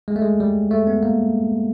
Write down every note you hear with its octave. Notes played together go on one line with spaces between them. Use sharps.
G#3
A3
G#3
G3
A3
B3
A#3